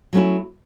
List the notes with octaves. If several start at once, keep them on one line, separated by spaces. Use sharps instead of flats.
F#3 A3 C#4 E4